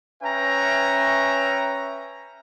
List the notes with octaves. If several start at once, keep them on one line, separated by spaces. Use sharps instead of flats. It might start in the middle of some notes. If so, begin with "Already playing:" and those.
C#4 B4 E5 G5 A#5